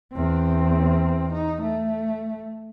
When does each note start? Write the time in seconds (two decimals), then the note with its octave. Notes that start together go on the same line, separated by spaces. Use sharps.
0.14 E2 C4
1.33 D#4
1.62 A3